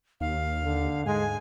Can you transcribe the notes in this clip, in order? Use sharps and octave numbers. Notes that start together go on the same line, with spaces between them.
D#2 F5
D3
G#2 G#3 G#5